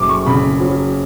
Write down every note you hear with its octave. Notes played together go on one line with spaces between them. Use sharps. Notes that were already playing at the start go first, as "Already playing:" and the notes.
Already playing: F#1 F#2 D6
C#6
C#3 B5
F#3